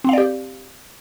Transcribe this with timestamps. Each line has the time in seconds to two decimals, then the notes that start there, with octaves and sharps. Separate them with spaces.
0.04 C4
0.09 F5
0.13 D5
0.18 G4